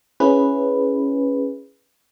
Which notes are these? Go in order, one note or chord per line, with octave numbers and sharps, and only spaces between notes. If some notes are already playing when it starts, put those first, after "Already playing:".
C#4 E4 G#4 B4